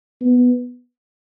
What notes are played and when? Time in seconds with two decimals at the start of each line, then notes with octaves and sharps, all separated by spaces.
0.21 B3